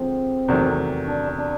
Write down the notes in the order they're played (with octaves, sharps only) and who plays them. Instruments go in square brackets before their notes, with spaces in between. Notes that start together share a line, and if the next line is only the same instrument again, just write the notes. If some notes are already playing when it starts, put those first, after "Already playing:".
Already playing: [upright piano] D3 F3 G#3 [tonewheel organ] C4
[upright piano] E2 C3 D#3 F#3 A3
[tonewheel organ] D4
D4